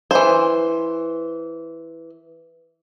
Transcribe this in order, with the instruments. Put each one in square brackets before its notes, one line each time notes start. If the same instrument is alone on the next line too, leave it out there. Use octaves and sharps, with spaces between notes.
[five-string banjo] E3 C5